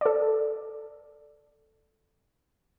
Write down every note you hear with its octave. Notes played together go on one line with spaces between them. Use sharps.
A4 D5